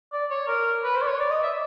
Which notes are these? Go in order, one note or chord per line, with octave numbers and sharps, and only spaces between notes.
D5
C#5
A#4
B4
C5
D5
C#5
D5
D#5
E5